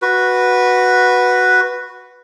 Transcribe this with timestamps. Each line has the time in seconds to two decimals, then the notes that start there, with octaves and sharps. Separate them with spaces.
0.02 F#4 B4